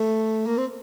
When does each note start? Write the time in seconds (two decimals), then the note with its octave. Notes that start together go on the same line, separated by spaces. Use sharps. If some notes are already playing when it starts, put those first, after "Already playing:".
Already playing: A3
0.46 A#3
0.58 C4